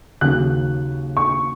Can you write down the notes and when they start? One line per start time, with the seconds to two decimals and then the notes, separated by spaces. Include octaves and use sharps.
0.21 D#2 C#3 F#3 F#6
1.17 C#6